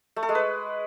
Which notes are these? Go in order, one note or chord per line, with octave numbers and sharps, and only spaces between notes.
A3
A4
G#3
B4